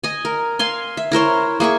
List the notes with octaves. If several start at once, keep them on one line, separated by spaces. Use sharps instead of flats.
D#5 G#5
A#4
F5 G#5 C6
E5
E4 A#4 C5 C#5
A#3 G#4 E5 C#6